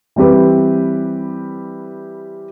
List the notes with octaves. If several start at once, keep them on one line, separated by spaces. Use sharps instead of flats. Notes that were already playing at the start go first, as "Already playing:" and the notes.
E3 G3 C4 G4 B4